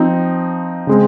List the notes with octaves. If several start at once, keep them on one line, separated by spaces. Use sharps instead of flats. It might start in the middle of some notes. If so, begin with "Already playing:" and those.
Already playing: F3 C4 D#4
C#3 G#3 C4